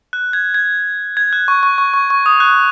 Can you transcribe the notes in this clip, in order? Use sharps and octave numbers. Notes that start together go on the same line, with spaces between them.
F#6
G#6
G#6
G#6
F#6
C#6
C#6
C#6
C#6
C#6
D#6
F#6